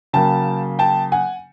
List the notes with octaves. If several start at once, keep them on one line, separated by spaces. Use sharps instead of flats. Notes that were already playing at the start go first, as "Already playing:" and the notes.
C#3 F#3 A#3 G5 A5
G5 A5
F#5 G#5